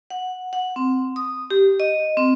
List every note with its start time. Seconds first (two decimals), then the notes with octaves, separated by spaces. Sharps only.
0.10 F#5
0.53 F#5
0.76 C4
1.16 D#6
1.50 G4
1.80 D#5
2.17 C4